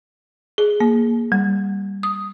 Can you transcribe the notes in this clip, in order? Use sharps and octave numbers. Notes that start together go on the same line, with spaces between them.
G#4
A#3
G3
D#6